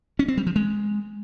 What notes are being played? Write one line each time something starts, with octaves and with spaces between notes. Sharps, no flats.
C#4
C4
G3
F3
G#3